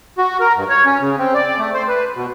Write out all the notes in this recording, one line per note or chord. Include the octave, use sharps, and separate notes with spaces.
F#4
A#4
G2
C#5
C#4
C#3
C4
D5
A3
C5
B4
B2